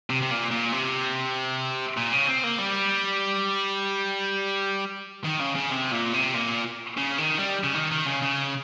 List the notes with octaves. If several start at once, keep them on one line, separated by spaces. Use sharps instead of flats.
C3
C3
A#2
A#2
C3
A#2
C#3
C4
A#3
G3
D#3
C#3
C#3
C3
A#2
C3
A#2
C#3
D#3
G3
C#3
D#3
D#3
C#3
C#3